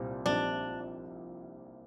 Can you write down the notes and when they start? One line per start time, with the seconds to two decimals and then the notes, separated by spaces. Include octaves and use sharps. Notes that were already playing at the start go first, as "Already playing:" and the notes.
Already playing: C2 A#2 G3 C4
0.25 A#1 A#2 G3 C4 D4 D#4